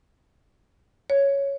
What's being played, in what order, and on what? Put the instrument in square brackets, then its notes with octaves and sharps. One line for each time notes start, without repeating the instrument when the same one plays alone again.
[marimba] C#5